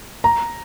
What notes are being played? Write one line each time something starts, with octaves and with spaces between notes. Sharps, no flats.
A#5